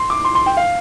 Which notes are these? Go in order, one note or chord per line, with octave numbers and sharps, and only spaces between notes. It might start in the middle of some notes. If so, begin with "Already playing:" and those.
Already playing: C6
D6
C6
C6
G5
F5